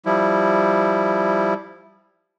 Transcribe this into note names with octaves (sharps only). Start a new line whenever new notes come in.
F3 G3 E4